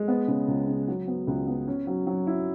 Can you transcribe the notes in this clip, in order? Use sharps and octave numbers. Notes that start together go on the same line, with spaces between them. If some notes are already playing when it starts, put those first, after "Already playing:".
Already playing: G#3
B3
C#3
C#2
C#3
F#3
B3
C#2
B3
C#4
F#3
F#3
E4